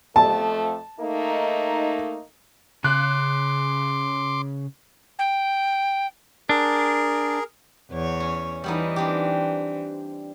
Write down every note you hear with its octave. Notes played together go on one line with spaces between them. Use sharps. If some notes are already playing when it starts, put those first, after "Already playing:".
F2 A3 A5
A3 A#3 D#4
C#3 C6 D6 F#6
G5
D4 G#4 A#4
E2 C#5
C#4
E3 G3 B3 D#4
C4 D4 G4